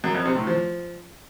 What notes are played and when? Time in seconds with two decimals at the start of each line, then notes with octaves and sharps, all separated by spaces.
0.04 F#2
0.15 F2
0.25 C3
0.36 A2
0.47 F3